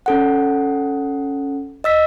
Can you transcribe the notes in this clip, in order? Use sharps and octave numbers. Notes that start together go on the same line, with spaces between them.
C#4 A4 F#5
D#5 E6 B6